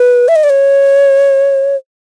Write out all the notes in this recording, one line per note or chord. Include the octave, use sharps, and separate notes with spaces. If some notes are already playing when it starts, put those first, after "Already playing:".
Already playing: B4
E5
D#5
D5
C#5